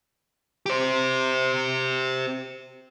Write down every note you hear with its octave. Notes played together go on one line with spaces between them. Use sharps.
G4 C5